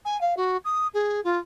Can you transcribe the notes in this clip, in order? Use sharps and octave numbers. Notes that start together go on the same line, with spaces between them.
G#5
F5
F#4
D#6
G#4
F4